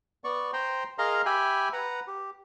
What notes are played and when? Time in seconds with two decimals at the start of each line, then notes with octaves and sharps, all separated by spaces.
0.24 B3 D5 C#6
0.53 C5 G5 A#5 C6
0.98 G#4 A#4 D#5 F5 A#5 C6
1.26 G4 E5 G5 G#5 B5
1.73 B4 F#5 A#5
2.08 G4